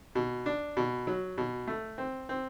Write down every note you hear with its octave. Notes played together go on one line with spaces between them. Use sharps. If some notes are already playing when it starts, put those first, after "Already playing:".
B2
D4
B2
F#3
B2
A3
C4
C4